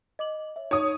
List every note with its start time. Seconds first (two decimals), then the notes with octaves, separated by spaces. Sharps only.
0.19 D#5 D6 F#7
0.56 C#5 E5
0.71 D#4 C#5 D#6